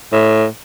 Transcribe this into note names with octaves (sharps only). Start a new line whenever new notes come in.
A2